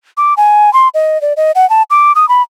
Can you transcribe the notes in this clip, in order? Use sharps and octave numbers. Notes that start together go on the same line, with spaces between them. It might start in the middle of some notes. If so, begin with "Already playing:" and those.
D6
G#5
C6
D#5
D5
D#5
F#5
A5
D6
D#6
B5